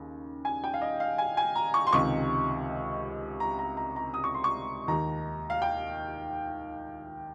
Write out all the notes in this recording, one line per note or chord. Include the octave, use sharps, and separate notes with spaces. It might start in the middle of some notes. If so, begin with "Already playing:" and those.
Already playing: D#2 C#3
G#5
G5
F5
D#5
F5
G#5
G#5
A#5
C#6
C6
C#2 C3 D#3 C#6
A#5
A#5
A#5
A#5
D#6
C#6
C6
C#6
D#2 D#3 A#5
F5
G5